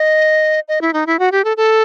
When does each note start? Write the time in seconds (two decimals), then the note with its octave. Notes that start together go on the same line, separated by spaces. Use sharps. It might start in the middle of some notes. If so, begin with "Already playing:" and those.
Already playing: D#5
0.68 D#5
0.81 E4
0.93 D#4
1.07 E4
1.19 F#4
1.32 G4
1.44 A4
1.57 A4